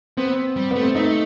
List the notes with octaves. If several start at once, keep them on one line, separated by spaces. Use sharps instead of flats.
B3 C4
G3
A3 B3
C4
A3 D#4